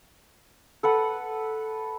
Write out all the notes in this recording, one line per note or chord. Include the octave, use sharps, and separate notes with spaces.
A4 B4 F#5